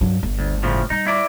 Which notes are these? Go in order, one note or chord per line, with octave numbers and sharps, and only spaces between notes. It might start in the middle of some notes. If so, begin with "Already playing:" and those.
G2 F#3
G1
D2
A2 C#3 F3
G3 D#4
E4 D5